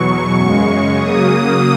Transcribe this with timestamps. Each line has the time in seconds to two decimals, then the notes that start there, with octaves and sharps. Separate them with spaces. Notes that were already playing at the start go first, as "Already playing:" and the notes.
Already playing: E2 B2 F#3 C#6
0.33 F#2 C#3 G#3
0.96 C#3 F#3 A#3 D#6